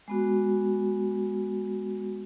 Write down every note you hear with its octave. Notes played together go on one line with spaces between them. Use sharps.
G#3 B3 F#4